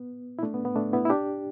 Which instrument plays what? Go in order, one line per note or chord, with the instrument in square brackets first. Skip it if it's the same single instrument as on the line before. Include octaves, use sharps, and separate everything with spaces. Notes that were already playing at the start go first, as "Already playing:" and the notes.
Already playing: [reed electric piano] B3
E4
A3 D4
B3
B3
A3 D4
B3 E4
E4
D4 G4